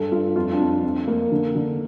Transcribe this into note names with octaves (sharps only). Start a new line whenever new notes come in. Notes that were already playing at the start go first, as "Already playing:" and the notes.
Already playing: G2 A4
G2 F4
F2 F4
D4
F2
F2
A#3
D3
D3